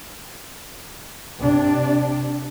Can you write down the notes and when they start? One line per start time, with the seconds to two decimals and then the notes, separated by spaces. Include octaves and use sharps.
1.39 C3 D4